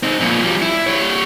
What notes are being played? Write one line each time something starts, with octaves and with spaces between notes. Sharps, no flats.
C4 D#4
F2 A#2
F3 G3
E4
G3 C#5